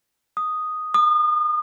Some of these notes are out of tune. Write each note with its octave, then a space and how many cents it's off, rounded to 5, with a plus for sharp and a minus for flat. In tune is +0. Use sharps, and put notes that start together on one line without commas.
D#6 -5
D#6 -35